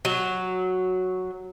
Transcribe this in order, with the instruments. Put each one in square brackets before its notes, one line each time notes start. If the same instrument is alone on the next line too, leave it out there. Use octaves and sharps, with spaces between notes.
[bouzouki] F#3